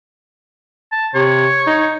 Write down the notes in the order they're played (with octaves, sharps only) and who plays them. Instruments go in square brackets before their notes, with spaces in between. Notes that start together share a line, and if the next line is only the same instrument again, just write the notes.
[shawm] A5
[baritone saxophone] C3 [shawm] C#5
[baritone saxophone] D#4